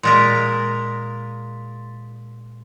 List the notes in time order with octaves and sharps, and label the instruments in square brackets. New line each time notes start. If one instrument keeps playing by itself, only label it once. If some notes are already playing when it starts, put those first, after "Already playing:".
[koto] A#2 G#3 A#4 [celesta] C6 A6 B6